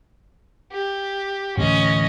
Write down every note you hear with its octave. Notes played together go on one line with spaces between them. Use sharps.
G4
A2 D3 E3 C#4 D#5